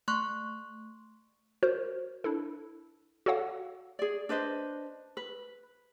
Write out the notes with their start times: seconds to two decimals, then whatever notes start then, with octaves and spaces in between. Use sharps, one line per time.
0.08 A3 C6 C#6 F#6
1.63 F#4 A#4 C5 C#5
2.24 D4 E4 A4
3.26 F#4 A4 C#5 F5 F#5
3.99 G#4 D5
4.29 D4 B4 C5 D#5
5.17 B4